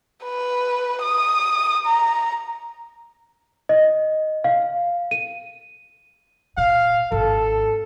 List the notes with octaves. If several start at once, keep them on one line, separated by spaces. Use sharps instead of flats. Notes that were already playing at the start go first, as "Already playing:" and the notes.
B4
D#6
A#5
D#5
F5
D#7
A#2 F5
G#1 A4